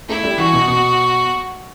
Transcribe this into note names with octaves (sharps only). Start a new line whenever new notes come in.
A3 E4
G3
E3 F#4
B2
B2